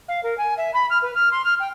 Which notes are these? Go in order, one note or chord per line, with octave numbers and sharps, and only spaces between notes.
F5
A#4
G#5
E5
B5
F6
B4
F6
C6
F6
G5